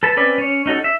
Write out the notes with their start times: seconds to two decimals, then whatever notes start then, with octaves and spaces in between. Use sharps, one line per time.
0.03 A4 B4 A5
0.17 C4 C#4 B4 D5
0.38 C#4 C#5
0.66 C#4 D#4 F#4 A4
0.84 E5